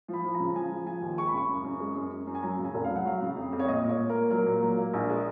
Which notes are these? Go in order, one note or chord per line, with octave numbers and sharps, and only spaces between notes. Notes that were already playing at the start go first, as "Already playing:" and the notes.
F3
B5
F3
A#5
C#3
F3 G#5
F3
F3 G#5
D#2
G#3 C#6
B5
C#3 C#6
F#2
F#2
G#3
F#2
F#2
F#2
G#5
F#3 A#5
C#3
G#5
F1
F5
F#3
F#5
F#3 F5
C#3
F2
F2
C#5
A#2 D#5
A#2
C#5
A#2
A#4
A#3
F#3 A#4
A#2
F#3
A#3
A#1
G#3